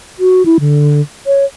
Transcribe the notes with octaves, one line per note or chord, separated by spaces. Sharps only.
F#4
E4
D3
C#5